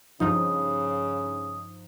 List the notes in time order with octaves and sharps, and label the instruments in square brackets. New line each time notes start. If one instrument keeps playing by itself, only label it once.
[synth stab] G2 F3 D#4 [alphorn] C#3 [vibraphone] D#6